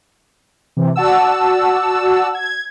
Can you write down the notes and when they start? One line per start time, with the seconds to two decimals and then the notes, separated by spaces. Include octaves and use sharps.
0.77 C3 E3
0.96 F#4 D5 F#5 A5 E6
2.35 G#6